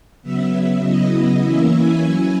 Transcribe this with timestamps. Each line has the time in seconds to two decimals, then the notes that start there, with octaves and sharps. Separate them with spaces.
0.23 C#3 F#3 B3 E5
0.83 C#3 F#3 B3 E4 D#5
1.43 E3 A#3 C#4 E4 E5
1.73 G#5
2.04 F#3 C#4 E4 G#5